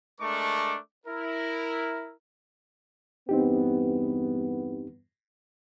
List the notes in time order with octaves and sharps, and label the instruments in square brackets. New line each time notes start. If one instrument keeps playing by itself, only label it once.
[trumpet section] G#3 A3 D4 A#4 C#6 D6
E4 A#4
[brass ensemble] E2 G2 B3 [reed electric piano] C4 D#4 G4